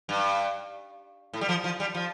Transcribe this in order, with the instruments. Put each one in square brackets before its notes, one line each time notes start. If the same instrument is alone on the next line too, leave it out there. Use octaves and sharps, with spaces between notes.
[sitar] G2
A2
G3
F3
F3
G3
F3